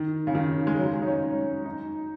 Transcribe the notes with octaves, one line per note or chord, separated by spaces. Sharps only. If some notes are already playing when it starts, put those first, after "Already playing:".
Already playing: D#3
C#3
D#3
G#3
F#3
G#3
D#4
C#4
D#4